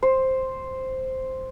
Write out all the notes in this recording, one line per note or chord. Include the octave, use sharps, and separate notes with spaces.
C5